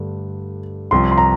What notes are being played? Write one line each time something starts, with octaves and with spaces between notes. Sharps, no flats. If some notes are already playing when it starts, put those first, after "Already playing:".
Already playing: G2 D3 A3
C2 C3 F3 C6
C6
A#5